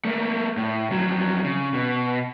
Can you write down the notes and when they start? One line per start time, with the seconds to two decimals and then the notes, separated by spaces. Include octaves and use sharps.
0.05 A3 A#3
0.57 A2
0.91 F2 F#3
1.44 C#3
1.74 B2